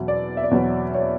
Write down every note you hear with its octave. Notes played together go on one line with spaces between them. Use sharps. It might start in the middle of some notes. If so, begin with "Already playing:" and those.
Already playing: E2 B2 F#3 E5
D5
E5
D5
E2 B2 F#3 C#5
C#5